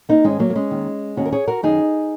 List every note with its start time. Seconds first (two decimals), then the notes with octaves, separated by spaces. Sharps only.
0.09 A#3 D#4
0.24 G#2 D#3 G#3 C#4
0.39 F#3 A#3
0.50 A#3
0.55 G#3 C#4
0.70 D#2 D#3
1.17 D#2 D#3 C#4 F#4
1.25 A#4
1.32 G#4 C#5
1.48 F#4 A#4
1.63 F#2 D#3 D#4 G#4